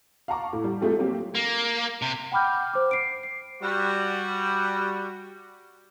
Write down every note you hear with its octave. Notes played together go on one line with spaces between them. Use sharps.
F5 F#5 A5 A#5 C#6 D6
A2
G3
F3 G#3 A3 C4 G4 A4
F#3 A#3 C4 G4
A#3
C3
F#5 G5 B5 D6 F6 G6
C5 D6
C7 D7
C7
G3 F#4